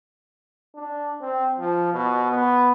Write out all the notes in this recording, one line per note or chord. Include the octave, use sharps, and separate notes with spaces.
D4
C4
F3
B2
B3